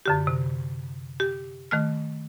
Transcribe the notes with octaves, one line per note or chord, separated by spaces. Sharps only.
F#2 D3 G4
C3
G4
D#3 A3 F6